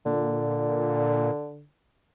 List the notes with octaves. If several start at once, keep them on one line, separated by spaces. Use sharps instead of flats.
A#2 D3